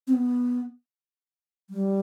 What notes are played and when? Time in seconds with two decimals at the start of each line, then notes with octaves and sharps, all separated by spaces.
0.07 C4
0.13 B3
1.70 G3